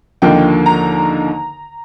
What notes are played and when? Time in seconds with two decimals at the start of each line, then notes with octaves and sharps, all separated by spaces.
0.22 D#2 D3 F3 A#3 D#4 G5
0.66 A#5